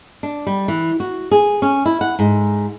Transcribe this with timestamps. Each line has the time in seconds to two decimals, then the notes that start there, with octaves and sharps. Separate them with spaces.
0.23 D4
0.47 G3
0.68 E3
1.00 F#4
1.31 G#4
1.62 C#4
1.86 E4
2.01 F#5
2.19 G#2